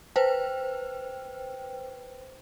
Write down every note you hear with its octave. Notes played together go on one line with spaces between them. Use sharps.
B4 C5 G5